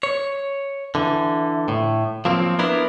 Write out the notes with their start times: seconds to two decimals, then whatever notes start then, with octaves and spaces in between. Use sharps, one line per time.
0.03 C#5
0.95 D3 E3
1.68 A2
2.25 F3 F#3 A#3 C4
2.59 B3 D4 E4 A#4